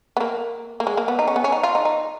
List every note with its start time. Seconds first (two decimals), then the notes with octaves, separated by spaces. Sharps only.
0.17 B3
0.20 A#3
0.80 A#3
0.87 G#3
0.97 A#3
1.08 B3
1.19 D#4
1.28 C#4
1.36 B3
1.44 C#4
1.52 D#4
1.63 F4
1.75 D#4
1.85 D#4